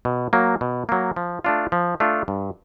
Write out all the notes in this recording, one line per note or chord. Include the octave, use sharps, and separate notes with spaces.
B2
F#3 A#3
B2
F#3 A#3
F3
A3 D4 F4
F3
A3 D4 F4
G2